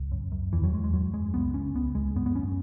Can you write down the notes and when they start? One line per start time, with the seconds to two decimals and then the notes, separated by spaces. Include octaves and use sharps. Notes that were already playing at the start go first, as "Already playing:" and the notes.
Already playing: C#2
0.11 F#2
0.32 F#2
0.52 E2 E3
0.64 F#3
0.73 E2 G#3
0.84 G#3
0.93 F#2 F#3
1.14 F#2 G#3
1.34 C#2 B3
1.54 C#2 C#4
1.74 C#2 B3
1.95 C#2 G#3
2.15 F#2 B3
2.26 B3
2.36 F#2 C#4